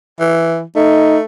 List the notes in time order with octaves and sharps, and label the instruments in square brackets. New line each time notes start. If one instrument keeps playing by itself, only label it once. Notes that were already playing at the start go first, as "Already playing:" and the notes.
[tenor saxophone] E3
[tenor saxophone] A3 [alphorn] D#4